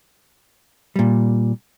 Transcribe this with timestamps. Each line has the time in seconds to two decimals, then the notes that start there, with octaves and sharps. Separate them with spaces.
0.96 A#2 G3